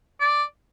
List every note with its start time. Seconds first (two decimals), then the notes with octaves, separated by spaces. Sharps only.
0.20 D5